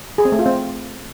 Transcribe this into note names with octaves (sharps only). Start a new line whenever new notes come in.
G#4
C4
A3
F4
C4